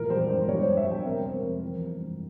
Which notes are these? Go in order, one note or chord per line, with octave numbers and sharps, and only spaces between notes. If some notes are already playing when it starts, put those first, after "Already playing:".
Already playing: A#2 E3 A#4
G3 C5
G2 C5
G3 C#5
G2 C5
E5
G3
G5
C3 A#4
G3 C5
A#4
F2
E3
G3
G2